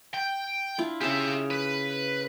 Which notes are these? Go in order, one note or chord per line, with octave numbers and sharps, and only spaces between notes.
G5
D4 E4 F4
C#3 G4 G#4 E5
B4